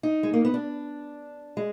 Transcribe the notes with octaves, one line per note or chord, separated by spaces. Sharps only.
D#4
G#3
A#3
B3
D4
G#3